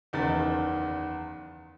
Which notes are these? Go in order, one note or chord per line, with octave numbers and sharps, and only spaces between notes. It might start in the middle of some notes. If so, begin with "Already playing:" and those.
F#1 E2 D#3 A6